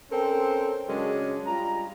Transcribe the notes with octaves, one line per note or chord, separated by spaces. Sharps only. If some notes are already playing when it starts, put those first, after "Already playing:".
C4 C#4 A4 A#4 C5
C#3 F#3 G#3 C#4 D4
G3 F4 A#5